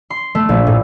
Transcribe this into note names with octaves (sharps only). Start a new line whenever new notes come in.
C6
A3
A#1
A2